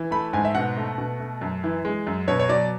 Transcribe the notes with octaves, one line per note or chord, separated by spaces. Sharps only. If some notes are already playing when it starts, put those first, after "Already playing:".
Already playing: E3
A3 B5
G#2 G#5
E5
B2 F#5
A3
B2
A3
F#2
E3
G#3
F#2
B2 C#5
C#5
F#3 D5